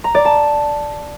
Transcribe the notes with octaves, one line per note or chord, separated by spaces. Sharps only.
A#5
D5
A5